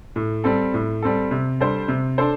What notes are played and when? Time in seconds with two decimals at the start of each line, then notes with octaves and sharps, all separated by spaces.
0.16 A2
0.44 G3 C4 A4
0.74 A2
1.03 G3 C4 A4
1.31 C3
1.61 G3 D4 A4 C5
1.88 C3
2.18 D4 A4 C5